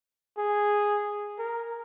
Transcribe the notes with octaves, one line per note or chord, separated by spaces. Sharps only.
G#4
A#4